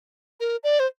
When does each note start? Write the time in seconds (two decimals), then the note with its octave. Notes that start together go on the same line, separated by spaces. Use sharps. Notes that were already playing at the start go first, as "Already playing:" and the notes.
0.40 A#4
0.64 D5
0.80 C5